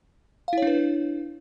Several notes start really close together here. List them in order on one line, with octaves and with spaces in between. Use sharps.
F5 E4 C#5 D4 B4